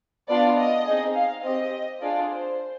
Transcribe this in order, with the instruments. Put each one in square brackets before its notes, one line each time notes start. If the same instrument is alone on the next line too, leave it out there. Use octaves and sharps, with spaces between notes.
[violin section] B3 D4 F4 D5
D#5
C4 D#4 G#4
F5
C4 G4 D#5
D4 F4 G#4 D5
C5